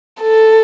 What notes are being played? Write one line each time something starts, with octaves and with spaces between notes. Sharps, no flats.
A4